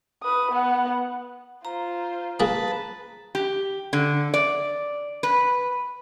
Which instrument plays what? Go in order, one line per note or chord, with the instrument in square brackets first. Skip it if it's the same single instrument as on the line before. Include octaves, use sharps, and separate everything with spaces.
[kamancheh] B4 D#6
B3 F#5
[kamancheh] F4 C5 [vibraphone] A#5
[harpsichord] A#3 G#4 [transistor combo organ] B4 A5
[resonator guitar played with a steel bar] G4
D3
D5
B4